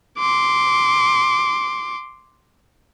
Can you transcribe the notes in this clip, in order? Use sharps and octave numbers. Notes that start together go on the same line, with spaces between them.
C6 D6